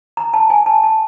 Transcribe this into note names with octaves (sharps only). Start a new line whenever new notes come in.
A#5
A5
G#5
A5
A5